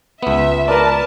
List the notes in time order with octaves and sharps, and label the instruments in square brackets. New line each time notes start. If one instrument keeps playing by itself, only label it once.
[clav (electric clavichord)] C#2 B3 [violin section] E5
[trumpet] A#4 [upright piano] B4 D5 [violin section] A5